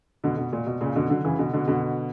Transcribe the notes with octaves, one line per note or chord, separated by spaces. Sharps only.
B2 D3
B2
A#2
B2
A#2 C#3
B2 D3
D3 F#3
C#3 E3
B2 D3
B2 D3
B2 D3